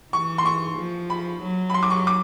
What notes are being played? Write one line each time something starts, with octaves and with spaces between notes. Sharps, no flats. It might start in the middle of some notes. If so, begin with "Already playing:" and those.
E3 C#6
C6
C#6
F3
B5
F#3
B5
C6
D6
C#6
D6